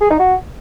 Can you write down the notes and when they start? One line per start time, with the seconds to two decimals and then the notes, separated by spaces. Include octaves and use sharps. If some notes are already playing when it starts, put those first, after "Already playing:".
0.01 G#4
0.10 D#4
0.19 F#4